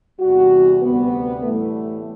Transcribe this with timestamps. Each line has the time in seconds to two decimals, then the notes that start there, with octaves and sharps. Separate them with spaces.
0.20 E2 C3 G3 F#4
0.82 D2 C3 G3 B3
1.43 A2 E3 G3 A3